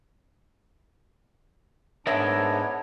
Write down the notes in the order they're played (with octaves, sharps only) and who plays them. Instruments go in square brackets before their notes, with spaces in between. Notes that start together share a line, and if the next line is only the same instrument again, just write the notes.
[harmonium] G#2 D4 [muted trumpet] B3 [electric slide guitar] A#4 D#5 E5 [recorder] C#5